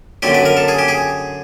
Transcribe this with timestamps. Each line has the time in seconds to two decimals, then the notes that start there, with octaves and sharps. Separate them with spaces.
0.22 F#2 D3 F#3 G4
0.34 B4
0.45 A#4
0.57 A4
0.68 G#4
0.79 G4
0.88 G#4